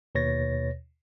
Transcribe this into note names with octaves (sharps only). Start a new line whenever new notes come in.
D#2 B2 B4 C#5 A6 A#6